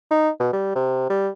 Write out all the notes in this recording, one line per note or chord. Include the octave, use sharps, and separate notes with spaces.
D#4
B2
G3
C3
G3